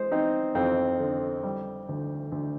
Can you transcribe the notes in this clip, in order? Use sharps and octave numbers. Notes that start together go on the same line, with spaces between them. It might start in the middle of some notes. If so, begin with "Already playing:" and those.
Already playing: G#3 C5
C4 D#4
F2 C4
D3
G3
D2
D2